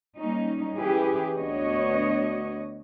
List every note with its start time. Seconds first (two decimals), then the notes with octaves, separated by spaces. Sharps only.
0.16 G3 A#3 C#4 D#4
0.76 E3 C#4 E4 G4 G#4 B4
1.36 D2 B3 D4 F#4 C#5 D#5